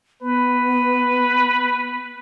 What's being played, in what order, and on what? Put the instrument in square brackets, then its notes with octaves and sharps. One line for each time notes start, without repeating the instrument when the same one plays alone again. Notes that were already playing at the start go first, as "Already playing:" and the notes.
[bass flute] B3 [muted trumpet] B4